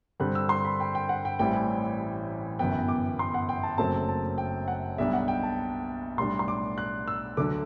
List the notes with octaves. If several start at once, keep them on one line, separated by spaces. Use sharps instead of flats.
G2 D3 G3 C4 F#6
E6
C6
B5
G5
G5
F#5
G5
A1 A2 E3 G3 C4 G5
G1 F#2 E3 B3 G5
D6
C6
F#5
G5
A5
F#1 F#2 F#3 A3 C4 A5
A5
G5
F#5
B1 B2 G3 D4 E5
F#5
G5
A5
B1 A2 G3 D4 C6
C6
D6
F#6
E6
D2 D3 F#3 A3 D4 D6